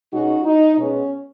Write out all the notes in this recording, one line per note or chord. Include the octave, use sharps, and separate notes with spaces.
B2 G#3 C#4 D#4 F#4
D#4
B2 G#3 B3 C#4